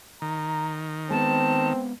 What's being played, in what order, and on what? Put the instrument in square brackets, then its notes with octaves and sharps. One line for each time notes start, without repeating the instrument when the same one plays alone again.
[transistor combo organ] D#3 [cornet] A#5
[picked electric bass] G#3 A3 B3 [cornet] C4 [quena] A5